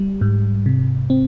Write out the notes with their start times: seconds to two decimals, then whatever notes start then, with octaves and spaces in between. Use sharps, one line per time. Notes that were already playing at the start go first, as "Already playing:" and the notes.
Already playing: G3
0.21 G#2
0.66 C3
1.10 C4